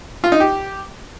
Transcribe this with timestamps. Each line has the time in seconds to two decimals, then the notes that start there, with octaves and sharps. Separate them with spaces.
0.24 F4
0.32 D#4
0.40 G4